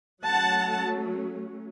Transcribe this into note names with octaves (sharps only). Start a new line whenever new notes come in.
F#3 A3 C#4 F#5 A5